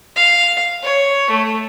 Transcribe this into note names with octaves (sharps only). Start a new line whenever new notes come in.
F5
C#5
A3